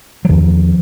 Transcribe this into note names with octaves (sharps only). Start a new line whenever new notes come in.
F#3
E2 D#3 F3